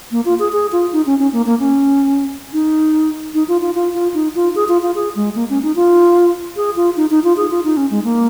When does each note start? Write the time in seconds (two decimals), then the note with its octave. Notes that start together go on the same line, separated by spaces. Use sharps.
0.12 A#3
0.25 F4
0.39 G#4
0.52 G#4
0.72 F4
0.93 D#4
1.06 C#4
1.19 C#4
1.33 A#3
1.46 A#3
1.60 C#4
2.53 D#4
3.34 D#4
3.48 F4
3.61 F4
3.75 F4
3.94 F4
4.14 D#4
4.35 F4
4.55 G#4
4.69 F4
4.82 F4
4.95 G#4
5.16 G#3
5.35 A#3
5.50 C#4
5.63 D#4
5.76 F4
6.56 G#4
6.76 F4
6.97 D#4
7.10 D#4
7.24 F4
7.37 G#4
7.51 F4
7.64 D#4
7.77 C#4
7.91 G#3
8.04 A#3